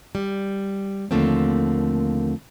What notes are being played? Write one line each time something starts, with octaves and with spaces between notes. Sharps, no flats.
G3
D#2 D3 F3 A3 A#3 C4